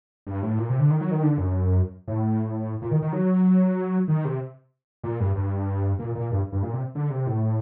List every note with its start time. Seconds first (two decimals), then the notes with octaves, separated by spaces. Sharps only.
0.27 G2
0.42 A2
0.58 A#2
0.69 C3
0.80 D3
0.90 D#3
1.01 F#3
1.11 D#3
1.23 D3
1.38 F#2
2.08 A2
2.82 A#2
2.91 D#3
3.02 D#3
3.12 F#3
4.08 D#3
4.25 C3
5.04 A#2
5.20 G2
5.36 G2
5.99 A#2
6.15 A#2
6.32 G2
6.52 G2
6.63 A#2
6.73 C3
6.95 D3
7.10 C3
7.27 A2